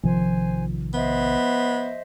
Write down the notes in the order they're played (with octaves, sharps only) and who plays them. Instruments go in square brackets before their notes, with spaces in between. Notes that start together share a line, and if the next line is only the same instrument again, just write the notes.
[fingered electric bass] A#1 C3 D#3 [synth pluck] F3 [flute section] C5 G#5
[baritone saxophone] B3 [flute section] C5 D#5 E5